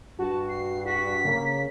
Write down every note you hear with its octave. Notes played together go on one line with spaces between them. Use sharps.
G2 F#4 A5
C7
F#4 B6
C#3 A#3